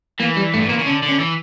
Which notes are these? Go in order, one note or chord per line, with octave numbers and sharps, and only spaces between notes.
E3 A#3
G3
G2 A3
A2
A#2 A#3
C#3
D3 C#4
D3
C#4
E3